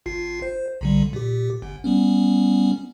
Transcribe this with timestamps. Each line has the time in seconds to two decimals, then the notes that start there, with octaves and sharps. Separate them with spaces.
0.06 G#1 F4 C7
0.42 C5
0.81 B1 D3 G3
1.13 A#2 G4
1.62 G1
1.84 G3 B3 C#4